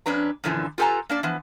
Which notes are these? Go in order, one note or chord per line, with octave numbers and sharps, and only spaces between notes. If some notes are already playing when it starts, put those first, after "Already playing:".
F2 C#4 D4 B4 A#5
F#2 A#2 D3 E3 F3
F4 G4 A4 B4 G#5 A#5
A#3 D4 D5
E3 F3 B3